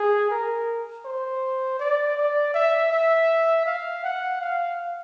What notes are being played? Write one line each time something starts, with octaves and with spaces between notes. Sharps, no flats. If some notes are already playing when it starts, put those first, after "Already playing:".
Already playing: G#4
A#4
C5
D5
D5
E5
E5
F5
F#5
F5